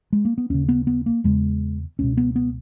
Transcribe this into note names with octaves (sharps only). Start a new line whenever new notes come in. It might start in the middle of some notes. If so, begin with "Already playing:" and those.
G#3
A#3
B3
D#2 C#3 C#4
B3
B3
A#3
E2 C#3 G#3
C#2 B2 C#4
B3
B3